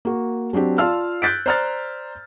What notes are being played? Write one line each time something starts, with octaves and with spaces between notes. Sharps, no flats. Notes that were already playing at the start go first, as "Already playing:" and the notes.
A#3 F#4
F#3 C4 D4 G4
F4 D5 F5 A5 E6 F6
F#6 G6 A6 B6 D7
C5 D5 A#5 F6 F#6 A6